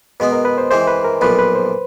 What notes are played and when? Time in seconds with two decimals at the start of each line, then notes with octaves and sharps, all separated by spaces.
0.20 B2 G#3 B3 B4
0.32 A#4
0.45 B4
0.58 C5
0.71 C3 E3 G#3 C5
0.87 B4
1.05 A#4
1.21 B1 A#2 F3 B4
1.39 B4
1.55 C5